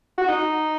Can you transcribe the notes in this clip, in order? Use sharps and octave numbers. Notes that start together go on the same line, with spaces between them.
F#4
D#4